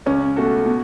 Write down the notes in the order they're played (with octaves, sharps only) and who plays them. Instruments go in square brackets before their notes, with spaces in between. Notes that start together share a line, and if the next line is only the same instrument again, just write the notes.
[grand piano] C#2 [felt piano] C#4
[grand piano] B2 A3 F#4 A4
B2